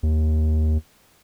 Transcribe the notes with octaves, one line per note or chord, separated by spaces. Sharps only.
D#2